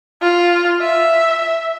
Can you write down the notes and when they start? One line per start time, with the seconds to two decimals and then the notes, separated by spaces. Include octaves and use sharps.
0.22 F4
0.82 E5